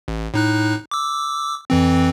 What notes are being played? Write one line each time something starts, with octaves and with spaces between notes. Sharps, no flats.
A1
A2 D#4 F#6
D6 E6
F2 E3 C4